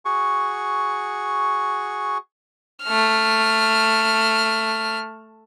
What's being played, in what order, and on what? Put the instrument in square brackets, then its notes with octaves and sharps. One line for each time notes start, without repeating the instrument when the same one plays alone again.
[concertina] F#4 G#4 C#6
[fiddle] A3 F6